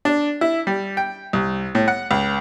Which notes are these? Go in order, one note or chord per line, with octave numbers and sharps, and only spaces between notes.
D4
E4
G3
G5
C2
A2
F#5
C#2